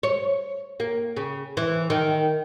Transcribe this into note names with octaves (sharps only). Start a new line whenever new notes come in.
C#5
A#3
C#3
E3
D#3